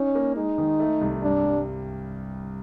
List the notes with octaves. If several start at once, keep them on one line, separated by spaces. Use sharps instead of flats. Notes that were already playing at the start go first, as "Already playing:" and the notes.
Already playing: C#4 D#4
A#3
G#3 D#4
D#3
A3
C2
G2 D4
G2